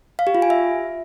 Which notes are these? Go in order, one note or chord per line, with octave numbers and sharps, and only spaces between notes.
F5
G4
F4
G#5
E5